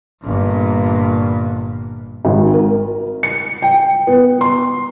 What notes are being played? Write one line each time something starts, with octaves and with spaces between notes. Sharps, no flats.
G1 A#2
G#1
A#4
C#7
G5
B3
C6